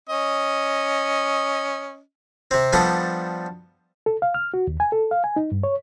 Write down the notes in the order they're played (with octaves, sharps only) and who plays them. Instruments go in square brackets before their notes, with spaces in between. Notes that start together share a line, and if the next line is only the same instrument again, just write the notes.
[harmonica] C#4 D#5
[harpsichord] C3 C4
F3 G3 B3 D4 A4 D#5
[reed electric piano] A4
F5
F6
F#4
D#2
G#5
A4
F5
G#5
D#4
G2
C#5